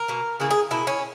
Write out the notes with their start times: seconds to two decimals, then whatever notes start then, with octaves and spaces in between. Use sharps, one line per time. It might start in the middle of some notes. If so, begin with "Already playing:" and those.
Already playing: A#4
0.08 B2 A#3
0.40 C#3 E3 A#3 G#4
0.51 G#4
0.71 B2 A#3 E4
0.87 C#4